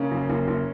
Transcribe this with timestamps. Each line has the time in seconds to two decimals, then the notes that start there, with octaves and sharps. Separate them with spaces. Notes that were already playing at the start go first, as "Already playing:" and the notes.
Already playing: C#3 A#3 C#4
0.12 F#1
0.30 F#1
0.48 F#1